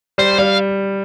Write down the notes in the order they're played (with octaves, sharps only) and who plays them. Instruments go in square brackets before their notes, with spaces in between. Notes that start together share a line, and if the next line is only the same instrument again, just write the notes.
[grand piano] G3 [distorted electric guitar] C5
[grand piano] G3 [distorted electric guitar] F5